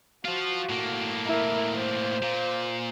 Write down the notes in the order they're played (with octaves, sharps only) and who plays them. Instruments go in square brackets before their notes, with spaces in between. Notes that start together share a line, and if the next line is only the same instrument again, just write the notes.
[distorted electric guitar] F3 F4 [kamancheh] F#4
[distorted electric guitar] A2 A#3
[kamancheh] E4 A#4
C5
[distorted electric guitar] A#2